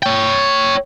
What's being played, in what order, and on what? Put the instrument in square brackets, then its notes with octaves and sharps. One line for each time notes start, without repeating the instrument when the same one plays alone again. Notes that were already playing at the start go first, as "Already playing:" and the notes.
[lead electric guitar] C#5 G5